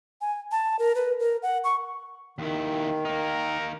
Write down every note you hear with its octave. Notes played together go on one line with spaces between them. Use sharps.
G#5
A5
A#4
B4
A#4
F#5
C#6
D#2 D#3 E4
A#3 D#4 A#4